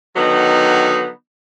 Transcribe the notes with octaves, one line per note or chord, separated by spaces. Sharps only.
D3 D#3 F#3 B3 D#4